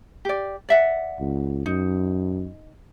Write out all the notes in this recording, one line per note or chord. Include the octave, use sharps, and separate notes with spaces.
G4 D5
D5 E5 F#5
C#2
F#2 D#4